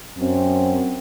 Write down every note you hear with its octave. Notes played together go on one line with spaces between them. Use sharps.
F#2 C4